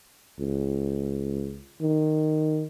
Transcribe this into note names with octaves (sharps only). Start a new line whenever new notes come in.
C#2
D#3